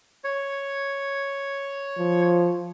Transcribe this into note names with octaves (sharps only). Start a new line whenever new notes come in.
C#5
F3